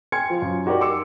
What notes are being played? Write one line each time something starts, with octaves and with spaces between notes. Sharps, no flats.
G5 G#5 C6 F6 G#6 C#7
F3 F4
F#2
D#4 F#4 G4 A#4 D5
C6 D6 E6 C#7